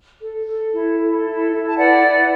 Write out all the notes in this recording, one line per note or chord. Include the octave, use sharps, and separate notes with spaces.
A4
A4
E4
A4
E4
E4
A5
B4 D5 F#5
E4